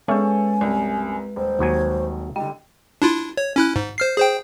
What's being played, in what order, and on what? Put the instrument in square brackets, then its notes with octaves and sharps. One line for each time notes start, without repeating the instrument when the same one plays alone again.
[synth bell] G#3 B4 [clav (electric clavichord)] C#4 [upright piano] G#4 A4 C#5 [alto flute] G#5
[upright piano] C2 F#2
[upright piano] D#1 [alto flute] C5
[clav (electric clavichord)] D#2 F#3 G#5
[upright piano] D3 G3 [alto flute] D#5 [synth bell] G5
[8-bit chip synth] D4 E4 F4
C#5
C#4 E4 F#6
G#2
C5 F6 C7
G#4 C5 G5